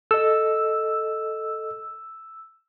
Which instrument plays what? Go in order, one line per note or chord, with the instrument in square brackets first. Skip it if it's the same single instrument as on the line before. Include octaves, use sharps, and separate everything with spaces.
[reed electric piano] A4 D#5 [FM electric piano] E6